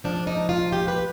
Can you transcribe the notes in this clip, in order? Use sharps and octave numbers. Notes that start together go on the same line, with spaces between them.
G#2 F3 D4
D#4
F4
G4
B4